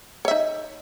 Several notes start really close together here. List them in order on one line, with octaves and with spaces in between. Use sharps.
C#5 E5 D#4